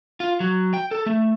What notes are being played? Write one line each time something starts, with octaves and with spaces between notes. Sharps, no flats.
F4
F#3
G5
A4
A3